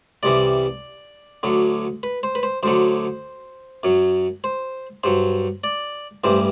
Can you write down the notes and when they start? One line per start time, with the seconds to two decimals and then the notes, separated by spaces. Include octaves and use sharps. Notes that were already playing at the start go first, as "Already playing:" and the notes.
0.23 C2 C3 E3 G3 D5
1.43 D2 D3 F#3
2.03 B4
2.23 C5
2.35 B4
2.43 C5
2.63 D2 D3 F#3 C5
3.83 F#2 F#3
4.44 C5
5.04 G2 F#3 C5
5.64 D5
6.24 A1 G2 E3 G3 C5